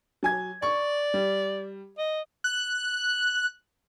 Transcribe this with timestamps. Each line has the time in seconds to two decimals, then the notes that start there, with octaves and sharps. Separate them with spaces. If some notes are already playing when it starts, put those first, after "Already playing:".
0.23 F#3 G#5 G#6
0.62 D5 C#6
1.14 G3
1.98 D#5
2.44 F#6